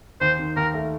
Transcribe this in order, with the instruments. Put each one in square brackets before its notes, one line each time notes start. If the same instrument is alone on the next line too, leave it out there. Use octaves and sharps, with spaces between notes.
[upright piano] D#2 [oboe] C5
[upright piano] D#3
[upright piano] D#2 [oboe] A#4
[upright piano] A3